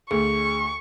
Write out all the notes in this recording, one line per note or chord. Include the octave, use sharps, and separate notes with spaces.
D2 G#4 C#6